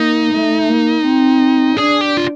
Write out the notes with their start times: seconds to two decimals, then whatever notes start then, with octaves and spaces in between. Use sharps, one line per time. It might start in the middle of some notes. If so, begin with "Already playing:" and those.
Already playing: A#3 D#4
0.34 A3
0.69 A#3
1.05 C4
1.77 D4 G#4
2.01 G4
2.17 F4